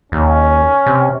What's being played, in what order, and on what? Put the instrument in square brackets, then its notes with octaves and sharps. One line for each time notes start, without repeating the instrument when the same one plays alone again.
[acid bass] D#2 [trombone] C#4
[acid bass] C3